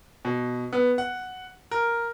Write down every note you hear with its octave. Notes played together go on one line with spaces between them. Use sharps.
B2
B3
F#5
A#4